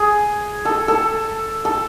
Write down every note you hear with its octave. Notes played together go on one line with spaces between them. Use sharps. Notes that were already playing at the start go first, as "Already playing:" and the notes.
Already playing: G#4
A4
A4
A4